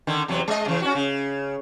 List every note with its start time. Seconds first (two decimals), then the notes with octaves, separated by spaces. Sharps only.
0.07 D3 D#3
0.28 E2 C3 F#3
0.48 G#3 D#5
0.66 C#3 E3
0.82 C#4 F#4
0.95 C#3